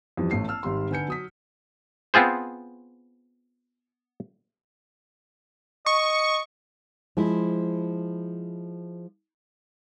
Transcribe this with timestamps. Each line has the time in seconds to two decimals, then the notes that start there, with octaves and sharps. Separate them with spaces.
0.17 F2 E3 G3
0.31 A1 A3 C7
0.48 A5 E6 F6
0.63 G#1 G3 C6
0.91 D3 B4 G#5 G6 C#7
1.08 F#3 D#6 B6
2.14 B3 C4 F4 G#4 C5
5.86 D#5 C#6
7.17 F3 G#3 E4